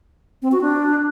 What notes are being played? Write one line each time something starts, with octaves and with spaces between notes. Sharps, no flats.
C4
F#4
D4